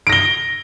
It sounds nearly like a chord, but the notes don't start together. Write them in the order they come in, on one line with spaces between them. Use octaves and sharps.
D7 A#6 G7